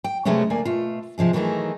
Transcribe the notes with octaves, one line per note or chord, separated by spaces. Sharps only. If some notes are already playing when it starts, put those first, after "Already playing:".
G5
C3 F#3 G#3 A3 B3 C#4
D2 A#3 D5 G#5
B2 A3 F4
C3 F3 G#3 G#4
D#3 E3 F#3 A3 D#4 G#4